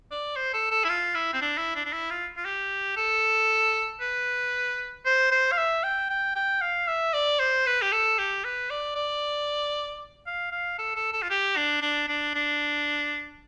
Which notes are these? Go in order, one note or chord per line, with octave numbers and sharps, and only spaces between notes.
D5
C5
A4
A4
E4
F4
E4
C4
D4
E4
D4
D4
E4
F4
F4
G4
A4
B4
C5
C5
F5
E5
G5
G5
G5
F5
E5
D5
C5
B4
G4
A4
G4
B4
D5
D5
F5
F5
A4
A4
A4
F4
G4
D4
D4
D4
D4